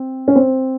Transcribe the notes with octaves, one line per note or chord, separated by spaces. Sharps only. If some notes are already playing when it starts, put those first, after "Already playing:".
Already playing: C4
C#4
C4